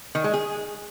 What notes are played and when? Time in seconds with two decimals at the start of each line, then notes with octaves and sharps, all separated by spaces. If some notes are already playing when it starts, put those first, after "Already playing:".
0.15 D#3
0.24 G#3
0.34 G#4